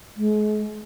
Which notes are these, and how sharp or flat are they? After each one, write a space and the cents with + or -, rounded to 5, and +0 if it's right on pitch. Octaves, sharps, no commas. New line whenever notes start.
G#3 +40